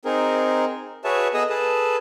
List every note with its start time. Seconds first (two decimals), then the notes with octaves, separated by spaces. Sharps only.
0.05 C4 D#4 G#4 A#4
1.04 F#4 G#4 B4 C#5 E5 A5
1.34 B3 G#4 A4 D#5 D#6 E6
1.50 G#4 A4 B4 A5